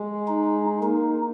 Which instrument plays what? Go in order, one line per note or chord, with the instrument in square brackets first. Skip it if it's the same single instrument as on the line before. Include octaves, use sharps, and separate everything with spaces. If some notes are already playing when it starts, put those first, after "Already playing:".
Already playing: [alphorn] G#3
[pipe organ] D#4
[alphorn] A#3 [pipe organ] D#4